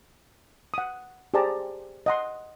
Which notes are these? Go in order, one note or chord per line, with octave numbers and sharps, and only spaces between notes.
F#5 D#6
G4 G#4 C5 D5 A5 A#5
D#5 F#5 C6